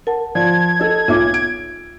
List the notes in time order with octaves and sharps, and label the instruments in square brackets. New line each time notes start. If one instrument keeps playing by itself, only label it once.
[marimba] A#4 F#5 A5
[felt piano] F3 [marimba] D5 [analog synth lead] G#6
[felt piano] A4 D#5
[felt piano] B1 [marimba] F4 E5 D6
[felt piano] D7